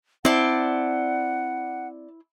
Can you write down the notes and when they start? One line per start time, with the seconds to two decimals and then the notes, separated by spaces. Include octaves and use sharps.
0.25 C4 E4 C5 D5 F#5 A5